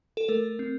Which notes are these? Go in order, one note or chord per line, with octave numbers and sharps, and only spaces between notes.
A4
A3 A#4
C4